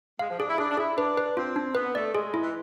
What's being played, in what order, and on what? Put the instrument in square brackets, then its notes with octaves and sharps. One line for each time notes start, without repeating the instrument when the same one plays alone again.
[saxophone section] G#3 [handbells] F5
[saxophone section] F3
[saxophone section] D4 [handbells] G#4
[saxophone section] E4
[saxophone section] D4 [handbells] G#4
[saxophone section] D4
[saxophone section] E4 [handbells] G#4
[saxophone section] D4 [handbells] B4
[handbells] B4
[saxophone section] C4 [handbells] F4
[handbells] D4
[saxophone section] B3 [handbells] B4
[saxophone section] A3 [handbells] D5
[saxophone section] G#3 [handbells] G#4
[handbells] E4
[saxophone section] E3